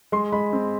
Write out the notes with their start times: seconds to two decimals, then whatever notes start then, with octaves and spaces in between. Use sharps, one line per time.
0.12 G#3 C6
0.32 G#3 B5
0.53 C4